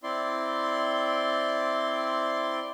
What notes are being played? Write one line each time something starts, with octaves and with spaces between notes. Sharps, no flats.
C4 E4 D5 C6